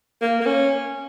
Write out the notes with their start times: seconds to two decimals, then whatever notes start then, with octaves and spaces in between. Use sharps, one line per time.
0.22 A#3
0.41 A#3
0.46 C#4